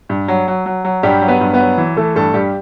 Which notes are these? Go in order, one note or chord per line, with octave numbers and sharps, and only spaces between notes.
G2
F#3
F#3
F#3
F#3
G2 G3 G4
F#3
B3 B4
G2
B3 B4
F#3
E3
E3 A3 A4
G2 A3 A4
G2 G3 G4